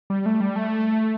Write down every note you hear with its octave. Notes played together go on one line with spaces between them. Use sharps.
G3
A3
G3
A3